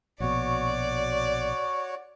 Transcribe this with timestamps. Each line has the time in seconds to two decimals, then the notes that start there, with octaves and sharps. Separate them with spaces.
0.20 A#1 B2 F#4 C#5 D5